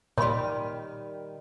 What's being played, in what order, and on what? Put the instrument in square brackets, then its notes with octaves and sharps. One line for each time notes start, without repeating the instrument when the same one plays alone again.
[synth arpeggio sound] A#2 [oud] D#3 G3 [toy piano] C#5 B5 C6